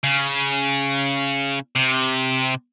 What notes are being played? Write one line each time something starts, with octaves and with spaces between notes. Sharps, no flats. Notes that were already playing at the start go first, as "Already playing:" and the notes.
C#3
C3